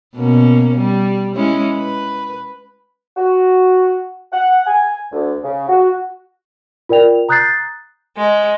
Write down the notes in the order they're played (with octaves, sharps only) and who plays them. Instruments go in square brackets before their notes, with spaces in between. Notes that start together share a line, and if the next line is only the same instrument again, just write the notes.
[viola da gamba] B2 A#3 C#4
G3
G#3 C#4 E4
B4
[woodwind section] F#4
F#5
G#5
D2
C#3
F#4
[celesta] F4 A#4 D5 G5 F7
A#5 D#6 F#6 G6 A6 C7
[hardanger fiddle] G#3